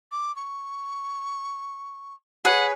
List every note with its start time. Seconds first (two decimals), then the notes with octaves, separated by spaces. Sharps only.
0.12 D6
0.36 C#6
2.45 G#4 B4 C#5 F#5 G#5